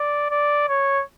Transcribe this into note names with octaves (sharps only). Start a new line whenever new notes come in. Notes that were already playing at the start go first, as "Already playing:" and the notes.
Already playing: D5
D5
C#5